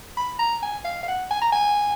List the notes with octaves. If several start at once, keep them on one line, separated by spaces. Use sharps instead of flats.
B5
A#5
G#5
F5
F5
F#5
G#5
A#5
G#5